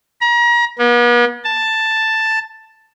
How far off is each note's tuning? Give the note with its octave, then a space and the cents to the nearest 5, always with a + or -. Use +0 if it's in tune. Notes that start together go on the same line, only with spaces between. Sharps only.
A#5 +35
B3 -45
A5 +5